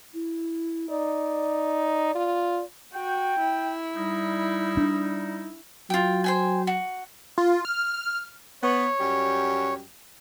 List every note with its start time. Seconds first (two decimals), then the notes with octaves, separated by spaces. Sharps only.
0.14 E4
0.90 D#4 D5
2.15 F4
2.94 F#4 G5
3.40 E4
3.96 G3 D#4
4.77 D4
5.90 F#3 F4 G5
6.24 C5 G5 G#5
6.67 F#4
7.38 F4
7.65 F6
8.63 B3 C#5
9.00 F#2 G3 G4